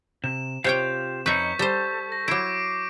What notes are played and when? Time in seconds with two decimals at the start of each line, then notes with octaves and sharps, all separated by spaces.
0.24 C3 E7
0.64 C3 F4 G4 C#5 F5 G5
1.26 F2 D#4 B4 C#5 E5 C#6 G6 B6
1.59 G3 A4 C5
2.12 A#6
2.28 F#3 E4 D6 C7 D7